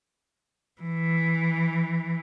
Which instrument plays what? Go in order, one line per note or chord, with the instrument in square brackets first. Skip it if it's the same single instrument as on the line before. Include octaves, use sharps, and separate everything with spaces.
[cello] E3